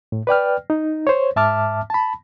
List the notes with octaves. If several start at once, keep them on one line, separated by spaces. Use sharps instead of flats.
A2
B4 D5 G5 F6
D#4
C5 C#5
G#2 E5 A5 D6 F6
A5 B5